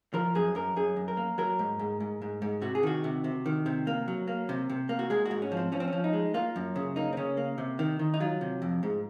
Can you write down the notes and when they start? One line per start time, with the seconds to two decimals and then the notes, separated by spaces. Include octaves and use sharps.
0.14 F3 A#4
0.35 F#2 G#4
0.55 F#2 A#4
0.76 F#2 G#4
0.96 F#2
1.08 A#4
1.17 A#3
1.38 F#3 A#4
1.59 G#2
1.79 G#2
2.00 G#2
2.22 G#2
2.42 G#2
2.62 C3 F#4
2.75 G#4
2.83 D#3 F#4
3.04 C3
3.24 C3
3.46 D#3
3.66 C3
3.87 A#3
4.08 F#3
4.28 A#3
4.49 C3
4.69 C3
4.89 A#3
4.99 F#4
5.10 G#3 G#4
5.25 F#4
5.31 G#2
5.42 C#4
5.52 F3
5.57 C4
5.72 F3 C#4
5.80 C4
5.88 C#4
5.93 F3
6.04 D#4
6.13 G#3
6.34 A#3 F4
6.56 F#2
6.76 C#3
6.96 A#3 D#4
7.13 C4
7.17 C#3 C#4
7.37 A#3
7.58 C3
7.79 D#3
7.99 D#3
8.14 D#4
8.20 F#3 F4
8.41 C3
8.62 F2
8.83 G#2